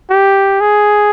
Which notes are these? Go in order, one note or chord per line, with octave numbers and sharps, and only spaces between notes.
G4
G#4